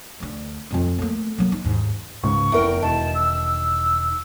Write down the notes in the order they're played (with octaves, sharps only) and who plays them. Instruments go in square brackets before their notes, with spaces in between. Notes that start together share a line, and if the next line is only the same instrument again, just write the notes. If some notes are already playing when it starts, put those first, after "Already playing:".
[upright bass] D2 D4
D#1 F2
A3 A#3
F#3 A#3
D#4
D#2 G#2
[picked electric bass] C#2 G#2 C#3 [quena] C#6
[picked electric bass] F1 [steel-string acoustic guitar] E2 A#4 G5
[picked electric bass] E1 [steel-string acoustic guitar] D#3 [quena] A5
[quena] E6